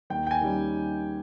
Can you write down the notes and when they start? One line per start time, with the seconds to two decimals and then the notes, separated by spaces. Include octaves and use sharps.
0.10 D#2 G5
0.27 G5
0.31 G#5
0.41 D#3 G3 C#4